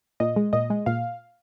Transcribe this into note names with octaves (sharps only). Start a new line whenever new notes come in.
A#2 D#5
G#3
A#2 D#5
G#3
A#2 F5